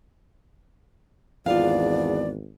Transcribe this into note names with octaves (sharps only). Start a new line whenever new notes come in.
G#1 E2 F4 D5 F5